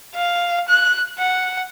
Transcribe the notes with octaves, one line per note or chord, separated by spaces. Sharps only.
F5
F#6
F#5